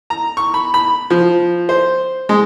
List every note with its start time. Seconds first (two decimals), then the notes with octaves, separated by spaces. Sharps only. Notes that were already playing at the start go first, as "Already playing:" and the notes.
0.10 A#5
0.37 C#6
0.54 B5
0.74 B5
1.10 F3
1.69 C5
2.29 G#3